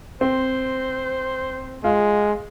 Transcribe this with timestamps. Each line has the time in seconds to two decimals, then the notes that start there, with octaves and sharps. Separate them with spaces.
0.21 C4 C5
1.84 G#3 F4